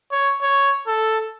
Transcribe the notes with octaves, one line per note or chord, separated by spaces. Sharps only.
C#5
C#5
A4